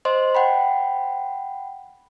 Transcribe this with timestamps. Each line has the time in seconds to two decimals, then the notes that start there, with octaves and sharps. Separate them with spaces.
0.05 C5 D#5 C6
0.35 F#5 G5 B5